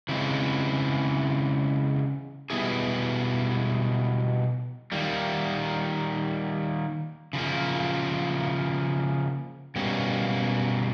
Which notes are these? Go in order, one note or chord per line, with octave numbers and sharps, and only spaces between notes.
C#3 E3 G#3 C4
B2 G3 B3 E4 G#4
D#3 G3 A#3
C#3 F3 A#3
B2 G3 A#3 C#4